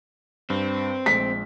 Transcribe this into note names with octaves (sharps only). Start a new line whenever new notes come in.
G2 C4
A#1 G#3 B6